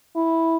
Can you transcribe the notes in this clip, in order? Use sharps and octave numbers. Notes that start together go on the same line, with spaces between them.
E4